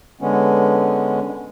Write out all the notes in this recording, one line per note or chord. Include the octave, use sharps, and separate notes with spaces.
D3 G#3 B3 C#4